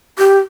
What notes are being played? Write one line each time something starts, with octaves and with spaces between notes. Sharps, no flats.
G4